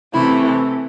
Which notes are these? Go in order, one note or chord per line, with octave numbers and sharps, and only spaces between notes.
C3 E3 A3 E4